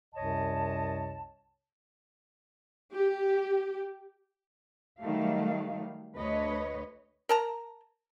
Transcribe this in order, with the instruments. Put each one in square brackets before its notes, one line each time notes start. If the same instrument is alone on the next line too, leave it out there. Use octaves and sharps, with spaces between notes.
[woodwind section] C2 F#2 C3 C#5 D#5 A5
[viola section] G4
[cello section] D#3 F#3 G3 A3 F5
D2 B4 C#5 D#5
[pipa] A#4 A5 A#5